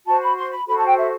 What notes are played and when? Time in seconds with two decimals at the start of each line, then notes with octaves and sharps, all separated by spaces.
0.05 F#4 C5 A5
0.20 B5
0.35 C6
0.50 B5
0.66 F#4 A4 C5 B5
0.77 A5
0.86 G5
0.96 E5